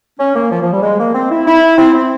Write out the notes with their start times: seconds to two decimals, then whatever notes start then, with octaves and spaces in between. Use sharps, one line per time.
0.19 C#4
0.35 A#3
0.51 F3
0.62 F3
0.72 G3
0.82 G#3
0.99 A#3
1.14 C4
1.31 E4
1.46 E4
1.78 C4
1.94 C4